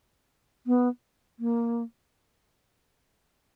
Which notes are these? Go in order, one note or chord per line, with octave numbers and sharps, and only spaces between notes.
B3
A#3